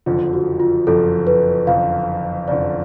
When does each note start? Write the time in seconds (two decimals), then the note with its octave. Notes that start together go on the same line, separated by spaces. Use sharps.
0.06 F#1 F2 D3 F3 F4
0.33 F#4
0.60 F4
0.87 F#1 F2 D3 F3 A4
1.27 B4
1.67 F#1 F2 D3 F3 F5
2.48 F#1 F2 D3 F3 D5